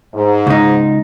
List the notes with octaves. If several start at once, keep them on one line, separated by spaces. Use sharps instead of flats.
G#2
C#2 D#4